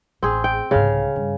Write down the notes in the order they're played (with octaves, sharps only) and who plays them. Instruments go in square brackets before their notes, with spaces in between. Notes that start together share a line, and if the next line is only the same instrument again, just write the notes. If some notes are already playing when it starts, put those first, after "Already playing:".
[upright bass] A1 [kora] C4 G#4
[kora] G5
[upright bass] C2 G#2 [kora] C#3 F5
[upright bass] G2